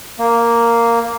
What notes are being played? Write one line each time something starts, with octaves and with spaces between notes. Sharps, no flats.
A#3